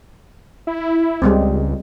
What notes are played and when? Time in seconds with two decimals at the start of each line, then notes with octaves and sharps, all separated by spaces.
0.67 E4
1.22 C#2 G3 G#3 C4